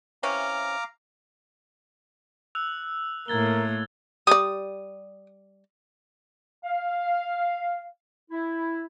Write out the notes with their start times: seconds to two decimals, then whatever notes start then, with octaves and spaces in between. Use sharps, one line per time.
0.23 C3 E3 C#4 F5 A#5 D6
2.55 E6 F#6 F7
3.28 A2 A#3 A#4 G#6 A6 G7
4.27 G3 D5 D#6
6.64 F5
8.31 E4